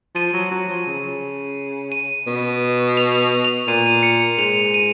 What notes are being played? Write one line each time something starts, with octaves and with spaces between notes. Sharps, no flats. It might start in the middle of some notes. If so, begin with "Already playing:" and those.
F3 D#7
F#3
F#3
F3
C#3
D#7
B2
F7
F7
A#2 D#7
D#7
C#7
G#2 F7
D#7